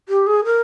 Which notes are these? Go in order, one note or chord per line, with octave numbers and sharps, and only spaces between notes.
G4
G#4
A#4